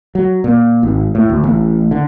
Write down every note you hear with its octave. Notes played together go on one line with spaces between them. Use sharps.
F#3
A#2
G#1
A2
D2
A1
D3